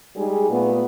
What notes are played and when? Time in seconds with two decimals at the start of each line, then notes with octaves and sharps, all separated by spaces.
0.15 G3 G#3 D#4 G#4
0.49 A#2 A3 B3